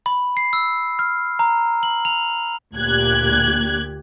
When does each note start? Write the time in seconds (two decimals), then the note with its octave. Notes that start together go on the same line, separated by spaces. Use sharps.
0.06 B5
0.37 C7
0.53 E6
0.99 F6
1.39 A#5
1.83 F#7
2.05 F7
2.75 D2 A#2 G4 F#6 G#6